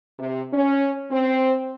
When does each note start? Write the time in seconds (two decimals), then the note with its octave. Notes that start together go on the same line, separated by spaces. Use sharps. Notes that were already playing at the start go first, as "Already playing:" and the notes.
0.19 C3
0.53 C#4
1.11 C4